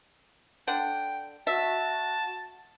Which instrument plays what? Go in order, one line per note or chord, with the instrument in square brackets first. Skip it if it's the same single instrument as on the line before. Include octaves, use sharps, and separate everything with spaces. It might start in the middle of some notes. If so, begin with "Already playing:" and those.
[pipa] D3 F#5 [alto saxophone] G5
[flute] F#4 [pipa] E5 [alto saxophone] A5